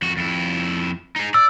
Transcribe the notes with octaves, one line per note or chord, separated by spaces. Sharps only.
F2 F#4
F2 E4
D#4 G#4
D5 E6